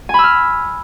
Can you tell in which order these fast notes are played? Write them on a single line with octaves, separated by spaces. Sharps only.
G#5 B5 E6 F6